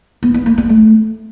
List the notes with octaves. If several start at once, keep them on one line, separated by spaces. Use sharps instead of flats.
B3
B3
A#3
C4
A3